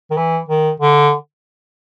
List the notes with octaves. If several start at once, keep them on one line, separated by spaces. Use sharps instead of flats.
D#3
E3
D#3
D3